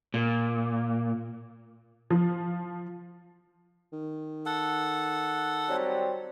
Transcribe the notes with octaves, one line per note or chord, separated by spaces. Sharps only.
A#2
F3
D#3
A4 F#5
F#3 G3 C4